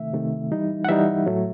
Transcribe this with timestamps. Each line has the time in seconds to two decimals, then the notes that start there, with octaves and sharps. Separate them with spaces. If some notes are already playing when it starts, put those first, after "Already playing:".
Already playing: C3 D#3 A3 E5
0.13 C3 D#3 A3
0.51 E3 G3 D#4
0.85 F#5
0.89 E3 G3 D#4 E5
1.26 A2 F#3 A3